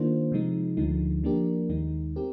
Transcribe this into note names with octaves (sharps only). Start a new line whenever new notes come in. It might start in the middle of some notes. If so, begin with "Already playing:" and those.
Already playing: D#3 A#3 D4 F4 C5
C3 F3 G#3 D#4
D2 D3 F3 G#3 D#4
F3 A#3 D4 G4 A#4
D#2 D#3 G#3 D#4
C4 G4 A#4